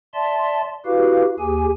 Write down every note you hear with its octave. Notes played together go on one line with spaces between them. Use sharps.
D5 E5 A5 C6
E4 F#4 G4 B4 F5
D#2 G4 G#4 G#5